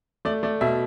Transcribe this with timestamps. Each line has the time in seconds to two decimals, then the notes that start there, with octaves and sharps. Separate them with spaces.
0.25 A3 D5
0.43 A3 D5
0.61 B2 E5